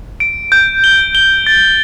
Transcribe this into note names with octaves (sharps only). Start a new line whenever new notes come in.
D7
G6
G7
G7
A6